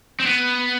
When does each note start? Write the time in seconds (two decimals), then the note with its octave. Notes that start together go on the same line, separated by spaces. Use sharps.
0.20 C4
0.26 B3